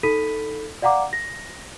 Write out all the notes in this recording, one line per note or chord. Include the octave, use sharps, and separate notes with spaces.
D#4 A4 B5 B6 D#7
D5 F5 F#5 A#5 D6
A#6